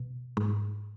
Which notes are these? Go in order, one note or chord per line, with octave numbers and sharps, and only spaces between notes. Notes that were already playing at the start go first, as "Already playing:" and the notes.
Already playing: B2
G#2